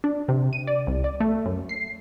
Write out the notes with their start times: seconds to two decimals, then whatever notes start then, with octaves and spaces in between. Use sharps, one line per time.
0.04 D4
0.28 C3
0.53 D#7
0.67 D5
0.87 C2
1.04 D5
1.20 A3
1.46 F#2
1.69 C7